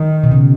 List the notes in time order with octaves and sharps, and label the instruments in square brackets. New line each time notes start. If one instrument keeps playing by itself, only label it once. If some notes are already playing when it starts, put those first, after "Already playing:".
Already playing: [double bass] D#3
[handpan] B2
C#3